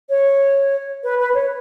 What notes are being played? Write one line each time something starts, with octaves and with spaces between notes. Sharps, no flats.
C#5
B4
B4
C#5